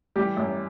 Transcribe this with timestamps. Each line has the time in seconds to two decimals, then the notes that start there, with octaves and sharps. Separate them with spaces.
0.16 E3 G3 G4
0.37 F#2